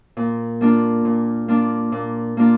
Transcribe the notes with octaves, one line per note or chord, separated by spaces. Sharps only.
A#2
A#3 D4 F4
A#2
A#3 D4 F4
A#2
A#3 D4 F4